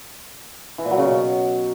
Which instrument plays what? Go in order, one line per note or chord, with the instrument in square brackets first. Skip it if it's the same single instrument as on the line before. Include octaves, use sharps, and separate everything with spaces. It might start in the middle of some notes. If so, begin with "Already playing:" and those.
[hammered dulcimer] E3
A#2
F#3
C#3
B2